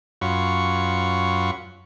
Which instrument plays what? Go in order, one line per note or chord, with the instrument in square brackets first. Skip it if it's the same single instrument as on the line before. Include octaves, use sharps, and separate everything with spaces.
[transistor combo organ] F#2 F4 F#4 C#5 B5 C#6